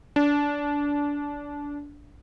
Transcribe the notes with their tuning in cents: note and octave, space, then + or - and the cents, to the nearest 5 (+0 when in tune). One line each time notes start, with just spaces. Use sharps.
D4 -20